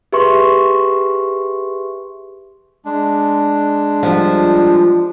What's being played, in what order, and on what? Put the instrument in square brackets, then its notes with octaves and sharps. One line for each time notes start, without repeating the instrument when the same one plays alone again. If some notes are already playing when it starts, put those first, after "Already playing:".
[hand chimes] G4 G#4 B4 E5 C6 C#6
[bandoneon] G#3 D4
[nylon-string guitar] F3 G3